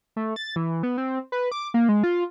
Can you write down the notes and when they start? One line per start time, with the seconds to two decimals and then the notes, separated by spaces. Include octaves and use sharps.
0.16 A3
0.36 A6
0.56 E3
0.83 B3
0.98 C4
1.32 B4
1.52 D6
1.74 A#3
1.89 G#3
2.04 F4